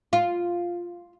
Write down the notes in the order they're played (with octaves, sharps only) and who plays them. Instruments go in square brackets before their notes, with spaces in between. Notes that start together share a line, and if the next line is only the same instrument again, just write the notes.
[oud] F4